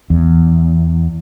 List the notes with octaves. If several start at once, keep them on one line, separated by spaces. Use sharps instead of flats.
E2